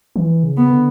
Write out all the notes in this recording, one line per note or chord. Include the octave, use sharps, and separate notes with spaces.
E3
C#3
B3
D3